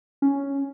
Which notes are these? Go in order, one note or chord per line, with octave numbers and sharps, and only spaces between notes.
C#4